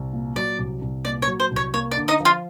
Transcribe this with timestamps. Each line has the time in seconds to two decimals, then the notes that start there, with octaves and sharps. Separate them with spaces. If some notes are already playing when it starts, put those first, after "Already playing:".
Already playing: C2
0.13 A#2
0.36 F#3 D5
0.59 C2
0.82 C2
1.05 A#2 D5
1.22 C#5
1.28 F#3
1.40 C5
1.51 C2
1.56 C#5
1.74 A#3 C#5
1.91 D5
1.97 D3
2.08 D#4 D#5
2.20 F3
2.25 F4 F5